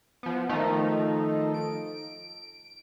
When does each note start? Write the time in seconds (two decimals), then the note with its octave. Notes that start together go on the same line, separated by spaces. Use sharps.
0.23 F3 B3
0.49 D#3 F3 A3 D#4
1.54 D7